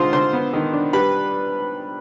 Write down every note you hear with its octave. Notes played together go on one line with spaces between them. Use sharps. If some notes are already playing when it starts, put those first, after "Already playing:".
Already playing: D3 D#3 G#3 F4 C5 C6
D3 C5 C6
B3
D#3
D4
G3 B4 B5